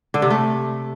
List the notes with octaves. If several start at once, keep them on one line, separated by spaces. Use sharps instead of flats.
D3
C3
A3